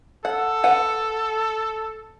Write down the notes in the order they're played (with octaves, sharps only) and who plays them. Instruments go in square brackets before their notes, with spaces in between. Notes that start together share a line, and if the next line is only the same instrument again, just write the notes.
[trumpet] A4 [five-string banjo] F#5
[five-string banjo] B4 F#5